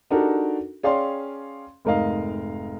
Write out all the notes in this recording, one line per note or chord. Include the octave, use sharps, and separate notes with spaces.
D4 D#4 F#4 G4 A4 A#4
C#4 G#4 D5 F5 G5 C6
F1 G#2 A#4 D#5 F5